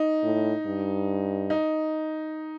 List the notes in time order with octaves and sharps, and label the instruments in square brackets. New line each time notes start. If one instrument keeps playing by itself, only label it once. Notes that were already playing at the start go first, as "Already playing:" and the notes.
Already playing: [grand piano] D#4
[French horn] A2
G2
[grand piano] D#4